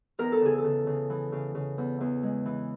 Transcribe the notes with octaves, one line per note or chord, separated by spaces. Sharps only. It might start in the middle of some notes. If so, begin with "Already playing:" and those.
E2 A#4
A4
C#3 G#4
A4
C#3
C#3
E3
C#3
C#3
E2
E2
G#3
E3